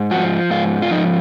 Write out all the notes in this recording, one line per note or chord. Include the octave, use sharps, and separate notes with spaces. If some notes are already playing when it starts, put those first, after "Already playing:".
Already playing: G#2
F3 F#4
G#2 F4
F4
F3 D#4